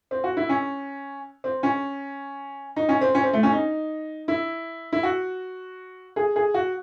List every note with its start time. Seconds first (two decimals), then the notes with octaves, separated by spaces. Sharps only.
0.11 C4
0.24 F#4
0.37 E4
0.49 C#4
1.44 C4
1.63 C#4
2.76 D#4
2.89 C#4
3.01 C4
3.15 C#4
3.24 C4
3.33 A3
3.43 C#4
3.52 D#4
4.28 E4
4.92 E4
5.03 F#4
6.16 G#4
6.36 G#4
6.54 F#4